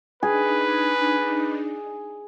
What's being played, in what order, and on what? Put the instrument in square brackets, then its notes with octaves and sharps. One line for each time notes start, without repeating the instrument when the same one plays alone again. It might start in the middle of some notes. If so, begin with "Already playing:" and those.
[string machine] D4 D#4 [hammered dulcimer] G#4 [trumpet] B4